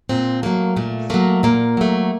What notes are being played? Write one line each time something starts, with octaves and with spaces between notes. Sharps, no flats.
A#2 C4
F#3 A3 A#3
A#2 A3
F#3 A3 A#3
A#2 A#3
F#3 A3